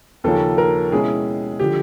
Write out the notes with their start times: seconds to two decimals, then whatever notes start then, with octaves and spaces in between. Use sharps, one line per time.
0.24 D#2 C#3 F3 A#3 C#4 A4
0.58 A#4
0.92 B2 G#3 C#4 E4 G#4
1.59 D3 F3 G4